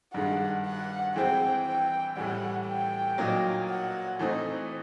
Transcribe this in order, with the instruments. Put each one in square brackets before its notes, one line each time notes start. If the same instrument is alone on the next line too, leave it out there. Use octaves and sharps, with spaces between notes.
[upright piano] G2 D#3 G#3 [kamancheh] F#5
[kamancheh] F#5
[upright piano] E3 G#3 C4 [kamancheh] G5
[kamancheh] G5
[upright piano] A2 E3 G3 [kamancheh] F#5
[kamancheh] G5
[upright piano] A#2 F#3 A#3 D#4
[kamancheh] F#5
[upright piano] E3 A3 C4 D#4